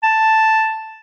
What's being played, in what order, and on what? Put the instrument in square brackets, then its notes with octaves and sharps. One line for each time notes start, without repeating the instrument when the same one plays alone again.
[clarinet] A5